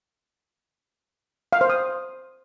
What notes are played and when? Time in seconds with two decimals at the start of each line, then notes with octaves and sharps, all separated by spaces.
1.53 F5
1.61 C5
1.70 D#6